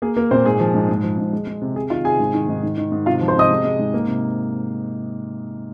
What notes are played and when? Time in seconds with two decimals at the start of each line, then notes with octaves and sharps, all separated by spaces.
0.02 A#3 G#4
0.16 A#3 A#4
0.31 A#2 C4 C5
0.45 G#2 G#4
0.60 F3
0.74 G#2
0.89 G#2
1.03 F3
1.18 G#2
1.33 G#3
1.47 G#3
1.62 C3
1.76 C3 G#4
1.90 D#3 F4 F5
2.05 C3 G#4 G#5
2.20 G#2
2.34 D#3
2.49 G#2
2.63 G#2
2.77 D#3
2.92 G#2
3.06 C3 F4 F5
3.21 F3
3.28 C5 C6
3.36 C3 D#5 D#6
3.50 G#3
3.64 G#3
3.79 G#2
3.94 A#3
4.07 C3